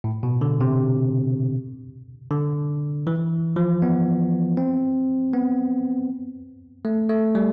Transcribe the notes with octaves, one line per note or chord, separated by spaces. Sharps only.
A2
B2
D3
C3
D3
E3
F3
B3
C4
B3
A3
A3
G3